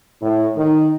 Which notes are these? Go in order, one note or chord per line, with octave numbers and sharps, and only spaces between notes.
A2
D#3